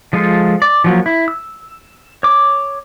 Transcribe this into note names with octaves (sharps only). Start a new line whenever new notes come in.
F3 G#3 F4 A4
D5
F3 F#3 A#3
E4
E6
C#5 D6